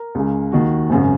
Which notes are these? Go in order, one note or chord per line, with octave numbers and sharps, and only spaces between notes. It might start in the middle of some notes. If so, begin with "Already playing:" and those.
Already playing: A#4
C#2 C#3
D#2 D#3 F#4
G#1 F#2 C#3